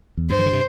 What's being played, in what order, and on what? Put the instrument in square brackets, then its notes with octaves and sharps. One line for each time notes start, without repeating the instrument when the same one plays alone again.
[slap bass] E2
[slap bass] G2 [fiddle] C5
[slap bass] E3
D3
C3